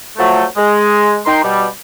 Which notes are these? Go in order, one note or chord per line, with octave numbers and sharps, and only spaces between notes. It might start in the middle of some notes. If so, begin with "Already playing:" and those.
F3 F#3 A3
G#3
D#4 A#4 G5 C6
B2 G3